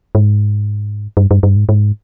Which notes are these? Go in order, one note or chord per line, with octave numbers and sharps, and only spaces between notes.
G#2
G2
G2
G2
G#2
G#2